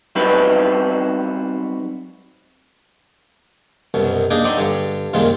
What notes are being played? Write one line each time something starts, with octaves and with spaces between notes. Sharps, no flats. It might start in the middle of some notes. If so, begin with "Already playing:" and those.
F#3 G3 B3 C4 D#4 B4
C2 F#2 B2
A#3 D4 D#4 G#4 A#4
F#3 C4 D5 D#5
G2 D3
C2 F#2 A#2 D#3 G#3 F4